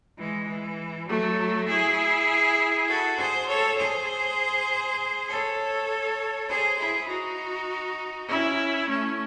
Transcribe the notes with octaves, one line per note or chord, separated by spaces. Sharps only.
E3 G#3
E3
F#3 A3
E4 G#4
F#4 A4
G#4 C5
A4 C#5
G#4 C5
A4 C#5
G#4 C5
E4 G#4
D#4 F#4
C#4 E4
A3 C#4